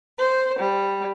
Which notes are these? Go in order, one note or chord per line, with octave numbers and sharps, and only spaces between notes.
C5
G3